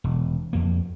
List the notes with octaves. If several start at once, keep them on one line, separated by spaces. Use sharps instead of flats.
E1
F2 A#3